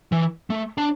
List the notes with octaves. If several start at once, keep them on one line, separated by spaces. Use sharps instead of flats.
E3
A3
D4